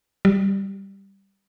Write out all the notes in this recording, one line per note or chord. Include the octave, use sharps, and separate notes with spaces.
G3